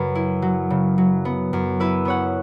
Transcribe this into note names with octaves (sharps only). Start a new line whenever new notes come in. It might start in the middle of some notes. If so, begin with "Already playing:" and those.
Already playing: F#2 C#3 B4
E4
F#3
C#3
F#3
B3
F#2
E4 B4 E5
B3 C#5 F#5